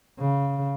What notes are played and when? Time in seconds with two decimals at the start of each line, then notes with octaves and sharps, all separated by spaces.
0.20 C#3